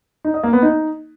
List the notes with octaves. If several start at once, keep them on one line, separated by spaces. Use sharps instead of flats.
D#4
D#5
A#3
B3
D#4